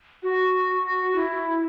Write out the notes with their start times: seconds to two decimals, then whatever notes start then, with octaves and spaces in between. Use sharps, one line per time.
0.23 F#4
1.15 E4